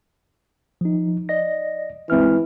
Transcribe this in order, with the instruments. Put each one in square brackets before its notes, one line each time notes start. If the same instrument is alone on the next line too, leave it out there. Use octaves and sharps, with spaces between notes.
[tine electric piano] F3 D#4
D5 D#5 A#6
[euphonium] E3 [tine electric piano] G#3 C4 F6